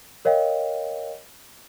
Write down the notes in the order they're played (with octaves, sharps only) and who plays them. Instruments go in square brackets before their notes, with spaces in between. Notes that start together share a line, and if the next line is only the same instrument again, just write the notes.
[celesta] A#4 C#5 D#5 F5 G5